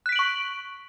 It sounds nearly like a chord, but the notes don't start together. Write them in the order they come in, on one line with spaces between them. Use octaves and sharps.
F#6 B6 D7 F#7 C#6